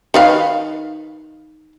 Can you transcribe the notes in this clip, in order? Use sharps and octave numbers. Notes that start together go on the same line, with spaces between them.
D#3 B4 F5